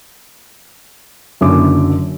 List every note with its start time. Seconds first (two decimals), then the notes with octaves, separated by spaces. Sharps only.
1.41 F#1 F#2 D3 D6